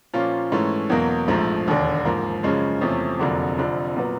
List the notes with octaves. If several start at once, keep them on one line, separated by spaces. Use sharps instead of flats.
A#2 F3 A#3 C#4 F4
G#2 E3 A3 C#4
E2 B2 F#3 A#3
A#1 G#2 F3 A3
E1 D#2 D3
G#2 F3 A#3
F#2 C#3 F3 G#3 C#4
E2 C3 F3 A3 C#4
F1 F2 D3 F#3 A#3
F1 F2 D3 F3
A#2 F#3 B3